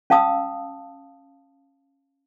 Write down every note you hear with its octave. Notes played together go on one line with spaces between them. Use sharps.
C#4 F5 A5 D#6 E6